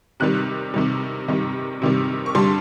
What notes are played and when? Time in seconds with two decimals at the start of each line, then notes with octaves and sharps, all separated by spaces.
0.20 C3 D#3 G3 F#6
0.74 C3 D#3 G3
1.28 C3 D#3 G3
1.82 C3 D#3 G3
2.26 C#6
2.35 G2 D3 G3 C6